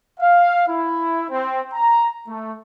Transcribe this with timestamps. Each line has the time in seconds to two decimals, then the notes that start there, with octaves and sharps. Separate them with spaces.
0.20 F5
0.68 E4
1.30 C4
1.73 A#5
2.28 A3